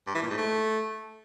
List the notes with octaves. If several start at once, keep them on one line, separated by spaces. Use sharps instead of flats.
G2
E3
A#2
G#2
A3